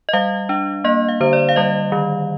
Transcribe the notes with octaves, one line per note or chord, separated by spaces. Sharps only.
D#5
G3 F5
D4
A#3 D#5
F5
D3 C5
D5
F5
G3 D#5
D#3